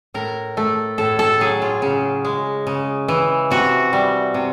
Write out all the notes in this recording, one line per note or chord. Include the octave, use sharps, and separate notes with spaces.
A2 A#4
A3
A2 A4
A4
F#3 G#4
F4
C#3
G#3
C#3
E3
C3 F#4
G3
C3